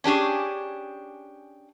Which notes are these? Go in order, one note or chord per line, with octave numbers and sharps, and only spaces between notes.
C#4 D4 G4 G#4